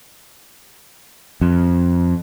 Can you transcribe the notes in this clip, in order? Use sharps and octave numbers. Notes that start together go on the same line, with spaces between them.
F2